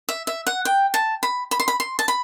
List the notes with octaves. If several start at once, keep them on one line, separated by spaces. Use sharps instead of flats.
E5
E5
F#5
G5
A5
B5
B5
C6
B5
C6
A5
B5